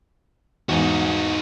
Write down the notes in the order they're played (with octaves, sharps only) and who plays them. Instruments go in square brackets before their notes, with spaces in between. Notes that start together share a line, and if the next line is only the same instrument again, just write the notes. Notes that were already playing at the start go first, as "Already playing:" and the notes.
[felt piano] E2 G#2 [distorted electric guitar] D#4 F#4